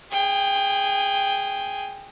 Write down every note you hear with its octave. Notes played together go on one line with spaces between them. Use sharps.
G#4 G5